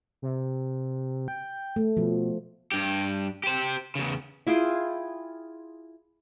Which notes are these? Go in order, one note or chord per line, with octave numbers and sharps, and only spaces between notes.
C3
G5
A3
B2 F3
G2 G4
G4 C5
E2 C#3
E4 F4 G#4 G5